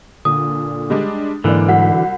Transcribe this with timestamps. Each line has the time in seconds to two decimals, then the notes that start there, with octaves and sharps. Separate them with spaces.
0.25 A#2 D3 D#6
0.90 G3 G#3 D4
1.44 G#2 D3 E3 A#3 D5
1.68 C2 F#3 F#5 B6